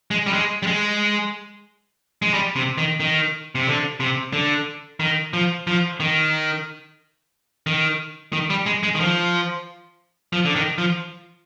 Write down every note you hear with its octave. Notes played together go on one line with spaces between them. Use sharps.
G#3
G3
G#3
G3
G#3
G#3
G3
C3
D#3
D#3
C3
D3
C3
D3
D#3
F3
F3
D#3
D#3
D#3
G3
G#3
G#3
D#3
F3
F3
D3
D#3
F3